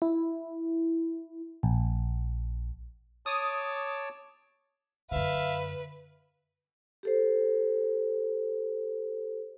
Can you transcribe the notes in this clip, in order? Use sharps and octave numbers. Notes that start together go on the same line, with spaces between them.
E4
A#1
C#5 A5 D6 D#6
F#2 D3 B4 E5 F5
G4 A4 C5